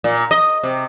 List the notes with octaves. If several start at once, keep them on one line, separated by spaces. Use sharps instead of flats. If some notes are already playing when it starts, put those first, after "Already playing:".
A#2
D#5
C3